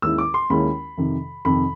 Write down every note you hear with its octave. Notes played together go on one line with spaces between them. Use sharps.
D#2 D#3 G#3 C#4 E4 E6
D6
C6
D#2 D#3 G#3 C#4 E4 B5
F2 C3 D#3
F2 C3 D#3 B5